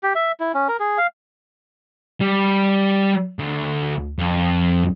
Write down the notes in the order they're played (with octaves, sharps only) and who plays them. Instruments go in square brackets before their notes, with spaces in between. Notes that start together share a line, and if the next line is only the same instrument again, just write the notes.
[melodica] G4
E5
E4
C#4
A#4
G#4
F5
[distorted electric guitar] G3
D2
F2